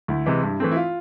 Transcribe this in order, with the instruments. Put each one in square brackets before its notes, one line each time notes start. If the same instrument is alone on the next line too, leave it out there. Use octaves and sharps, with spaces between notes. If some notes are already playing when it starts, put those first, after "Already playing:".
[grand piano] D2 [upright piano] E4
[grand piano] C3 E3 G#3
G2
E3 A3 C4
[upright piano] E4
F4